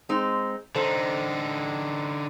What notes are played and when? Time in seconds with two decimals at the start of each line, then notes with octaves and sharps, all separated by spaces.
0.09 G#3 C4 D#4
0.75 D3 D#4 A4 C5